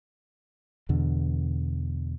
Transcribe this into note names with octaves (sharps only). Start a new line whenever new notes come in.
E2 B2 D3